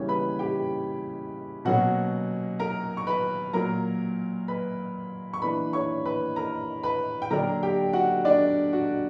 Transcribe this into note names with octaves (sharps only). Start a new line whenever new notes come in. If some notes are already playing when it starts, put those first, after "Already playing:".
Already playing: C#3 E3 G3 A#3 C#5
B4 B5
G4 G5
B2 F#3 A#3 C#4 F#4 F#5
A#4 A#5
C#6
B4 B5
A#2 F#3 A#3 A#4 A#5
B4 B5
C#6
E3 A#3 D4 B4 B5
C#5 C#6
B4 B5
A#4 A#5
B4 B5
G5
D3 F#3 A#3 D4 A#4 A#5
G4 G5
F#4 F#5
D4 D5
F#4